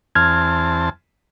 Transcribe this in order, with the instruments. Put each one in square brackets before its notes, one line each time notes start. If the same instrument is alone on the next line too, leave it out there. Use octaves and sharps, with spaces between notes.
[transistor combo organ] E2 C4 A5 [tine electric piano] F6 G#6